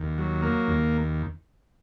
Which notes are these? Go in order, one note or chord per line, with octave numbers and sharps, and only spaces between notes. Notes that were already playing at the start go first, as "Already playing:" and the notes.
Already playing: D#2
F#3
A#3
D#2